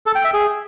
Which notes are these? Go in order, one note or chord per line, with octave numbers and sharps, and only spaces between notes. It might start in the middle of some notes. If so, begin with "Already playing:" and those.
A4
G5
E5
G#4